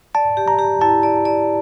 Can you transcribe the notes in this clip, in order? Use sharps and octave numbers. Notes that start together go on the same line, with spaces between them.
D5 A5
G4
A#5
G4
E4 A5
D5
D5